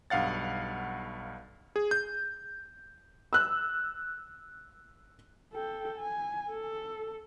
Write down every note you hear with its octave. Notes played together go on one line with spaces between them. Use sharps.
B1 G2 F5 F#5 A6
G#4
G6
E6 F#6
A4 G5
G#5
A4